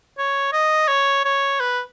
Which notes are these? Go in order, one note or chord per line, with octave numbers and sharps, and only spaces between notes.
C#5
D#5
C#5
C#5
B4